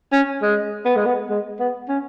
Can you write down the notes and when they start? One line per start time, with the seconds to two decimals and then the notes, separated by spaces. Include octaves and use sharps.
0.12 C#4
0.42 G#3
0.85 B3
0.96 G#3
1.05 B3
1.30 G#3
1.59 B3
1.88 C#4